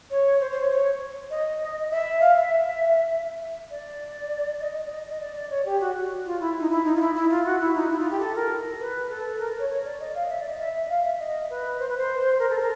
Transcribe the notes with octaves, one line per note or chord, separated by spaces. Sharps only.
C#5
C5
C5
C#5
C#5
D#5
E5
F5
E5
D5
D#5
D5
D#5
D#5
D5
D5
C#5
G4
F#4
F#4
F4
E4
D#4
E4
D#4
F4
E4
E4
F4
F#4
E4
D#4
E4
F4
G4
A4
A#4
B4
A4
A#4
C#5
C#5
D5
D#5
F5
D#5
E5
D5
D#5
E5
F5
E5
D#5
B4
C5
B4
C5
A#4
A4
A#4